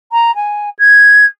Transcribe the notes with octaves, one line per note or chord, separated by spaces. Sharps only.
A#5
G#5
G#6